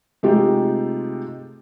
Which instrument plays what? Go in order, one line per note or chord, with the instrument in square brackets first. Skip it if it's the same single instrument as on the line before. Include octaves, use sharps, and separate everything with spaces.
[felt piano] C3 G#3 A3 D#4 F4 G4